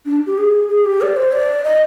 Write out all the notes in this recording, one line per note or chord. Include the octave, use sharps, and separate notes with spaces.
D4
G4
G#4
G#4
G4
D5
C5
D5
D#5